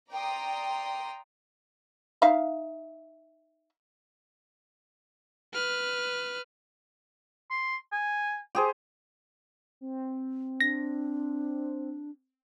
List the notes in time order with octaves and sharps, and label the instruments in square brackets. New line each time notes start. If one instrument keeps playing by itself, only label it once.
[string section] D5 G5 A#5 C6 D#6
[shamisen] D#4 E5 F5
[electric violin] B4 F6
[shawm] C6
G#5
[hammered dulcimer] G4 G#4 C5
[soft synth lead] C4
[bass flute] D4 [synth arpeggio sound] A#6